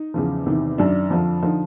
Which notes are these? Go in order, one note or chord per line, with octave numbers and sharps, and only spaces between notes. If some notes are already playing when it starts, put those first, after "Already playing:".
Already playing: D#4
E2 C#3 F3
E2 C3 D#3
F#2 D#3 D4
F2 D3 F3
D3 F3 D#4